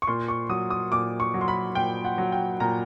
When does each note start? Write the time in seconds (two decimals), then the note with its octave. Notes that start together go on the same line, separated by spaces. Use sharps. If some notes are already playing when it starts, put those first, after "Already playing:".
0.02 C#6
0.07 A#2 C6
0.28 C#6
0.49 F#3 D#6
0.70 D#6
0.92 A#2 D6
1.20 C#6
1.34 F#3
1.41 C6
1.48 B5
1.75 A#2 G5
2.05 F#5
2.18 F#3
2.32 G5
2.60 A#2 A#5